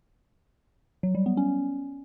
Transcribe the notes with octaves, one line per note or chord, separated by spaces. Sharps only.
F#3
G3
B3
C#4